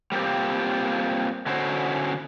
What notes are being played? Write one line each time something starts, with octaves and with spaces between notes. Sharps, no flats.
G3 A#3 C4 F4 G4
D3 C#4 E4 F#4 C5